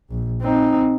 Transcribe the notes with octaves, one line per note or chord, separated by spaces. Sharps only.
A#1
C4 D#4